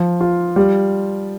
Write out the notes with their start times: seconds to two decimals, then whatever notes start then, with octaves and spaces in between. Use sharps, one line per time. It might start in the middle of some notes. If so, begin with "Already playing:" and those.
Already playing: F3
0.21 F4
0.56 G3